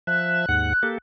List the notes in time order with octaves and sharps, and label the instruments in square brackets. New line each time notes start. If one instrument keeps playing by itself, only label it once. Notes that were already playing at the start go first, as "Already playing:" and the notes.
[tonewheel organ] F3 E5 [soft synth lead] F#6
[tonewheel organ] D#2 G#2 F#5
A#3 G4 A4